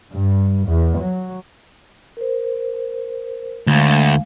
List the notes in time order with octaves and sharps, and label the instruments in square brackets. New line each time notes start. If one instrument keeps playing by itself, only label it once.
[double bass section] G2
E2
F#3
[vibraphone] A#4 C5
[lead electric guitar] D2 [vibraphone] G#3 F5